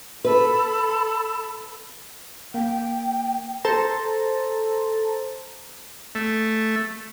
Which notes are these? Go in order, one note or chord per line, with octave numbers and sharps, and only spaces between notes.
A4 B4 B5
A#3 G5
A4 C5 A5 A#5
A3